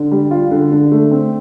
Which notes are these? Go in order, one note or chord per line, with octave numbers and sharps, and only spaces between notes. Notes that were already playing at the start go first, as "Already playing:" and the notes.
Already playing: D3
G3
F4
D3
D3
A3
C4